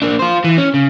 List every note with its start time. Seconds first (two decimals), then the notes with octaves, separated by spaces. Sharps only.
0.02 A#3 D4
0.19 F4 C5
0.44 E3
0.58 C#4
0.74 C#3